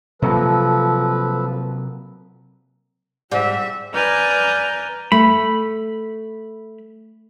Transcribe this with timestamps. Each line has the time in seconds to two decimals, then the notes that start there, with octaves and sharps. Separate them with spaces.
0.22 C3 F3 F#3 A#3 A4 B4
3.31 G#2 G3 D5 E5
3.94 B4 D5 G#5 A#5 F6 G6
5.12 A3 B5